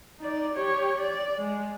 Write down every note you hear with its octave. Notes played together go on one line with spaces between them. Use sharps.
D#4 D5
G4 C#5
D5
G#3